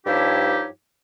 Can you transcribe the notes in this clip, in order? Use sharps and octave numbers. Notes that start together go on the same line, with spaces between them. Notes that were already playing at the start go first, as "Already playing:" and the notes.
G2 F3 D#4 E4 G4 C#5